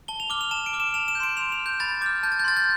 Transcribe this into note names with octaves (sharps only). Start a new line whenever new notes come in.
A5 G7
F7
D6 F6 G7
F7
A5 E7
D7
D6 F6
E7
A5 F7
E7
G6
C6 D7
C6 F7
F7
F6
G6
B5 A6
D6 G6
F6
A5 G6
A6
G6
C6 F6 A6
G6